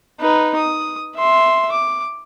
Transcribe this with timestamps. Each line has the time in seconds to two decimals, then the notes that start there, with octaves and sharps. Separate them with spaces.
0.20 D#4 B4
0.57 D#6
1.16 E5 C6
1.72 D6